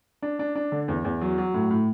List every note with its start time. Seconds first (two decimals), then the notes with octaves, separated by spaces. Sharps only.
0.22 D4
0.39 D4
0.55 D4
0.72 D3
0.88 E2
1.04 E2
1.21 F#3
1.38 F#3
1.54 A2
1.70 A2